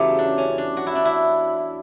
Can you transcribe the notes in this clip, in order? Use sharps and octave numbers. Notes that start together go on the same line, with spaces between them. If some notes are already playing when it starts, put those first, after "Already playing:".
Already playing: E2 C#3 F#3 A3 G4
D4
C#4
D4
F#4
E4
D4
E4